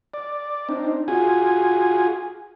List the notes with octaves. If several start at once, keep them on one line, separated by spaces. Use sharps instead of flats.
D5
C4 D4 D#4
F4 F#4 G#4 G#5